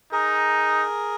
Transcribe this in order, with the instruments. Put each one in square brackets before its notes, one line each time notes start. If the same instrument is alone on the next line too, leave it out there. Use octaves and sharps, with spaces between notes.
[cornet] D#4 [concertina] G#4 A#4